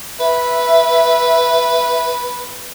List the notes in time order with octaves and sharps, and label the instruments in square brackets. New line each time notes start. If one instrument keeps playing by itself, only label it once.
[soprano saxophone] B4 [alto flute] E5